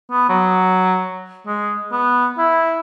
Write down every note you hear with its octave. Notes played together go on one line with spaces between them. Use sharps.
B3
F#3
G#3
B3
E4